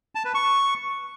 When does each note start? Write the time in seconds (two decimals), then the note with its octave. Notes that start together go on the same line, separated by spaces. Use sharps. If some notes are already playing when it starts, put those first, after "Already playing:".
0.15 A5
0.25 B4
0.35 C#6